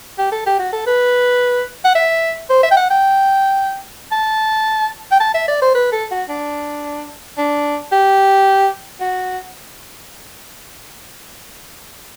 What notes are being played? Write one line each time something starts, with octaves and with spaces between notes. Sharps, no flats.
G4
A4
G4
F#4
A4
B4
F#5
E5
C5
E5
G5
F#5
G5
A5
G5
A5
E5
D5
C5
B4
A4
F#4
D4
D4
G4
F#4